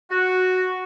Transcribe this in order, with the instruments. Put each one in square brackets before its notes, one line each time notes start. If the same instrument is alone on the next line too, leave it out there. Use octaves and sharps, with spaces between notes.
[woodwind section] F#4